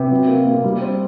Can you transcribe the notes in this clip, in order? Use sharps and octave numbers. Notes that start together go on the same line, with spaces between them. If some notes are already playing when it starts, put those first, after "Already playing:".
Already playing: C3 B3
F#3
A#3
A#3
G3
C4